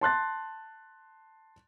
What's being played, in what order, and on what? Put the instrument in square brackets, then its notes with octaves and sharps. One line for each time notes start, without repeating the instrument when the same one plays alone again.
[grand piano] A5 C6 F#6 A6